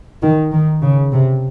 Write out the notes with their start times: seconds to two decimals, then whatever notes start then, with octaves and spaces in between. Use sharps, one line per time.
0.22 D#3
0.52 D#3
0.82 C#3
1.12 C3